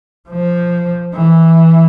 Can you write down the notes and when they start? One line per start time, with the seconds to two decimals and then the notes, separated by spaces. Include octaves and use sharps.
0.29 F3
1.14 E3